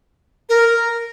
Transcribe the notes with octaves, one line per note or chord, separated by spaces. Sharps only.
A#4